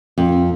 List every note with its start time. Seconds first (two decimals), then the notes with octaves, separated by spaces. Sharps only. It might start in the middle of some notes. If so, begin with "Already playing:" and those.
0.18 F2